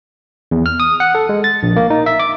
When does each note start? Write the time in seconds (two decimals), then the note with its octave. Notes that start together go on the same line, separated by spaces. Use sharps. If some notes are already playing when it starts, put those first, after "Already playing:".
0.51 E2
0.66 F6
0.80 D#6
1.00 F#5
1.15 A4
1.29 G#3
1.44 A6
1.63 A#1
1.76 A#3
1.90 D#4
2.06 E5
2.19 D6